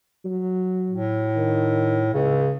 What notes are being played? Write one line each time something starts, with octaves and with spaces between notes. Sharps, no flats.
F#3
A2
D#3
C#2 C#3